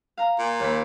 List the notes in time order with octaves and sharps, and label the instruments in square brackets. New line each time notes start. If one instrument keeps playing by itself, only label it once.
[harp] F5 A#5
[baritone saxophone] A#2
[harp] D#2 B5